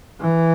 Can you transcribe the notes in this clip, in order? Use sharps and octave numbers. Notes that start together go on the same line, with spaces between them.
E3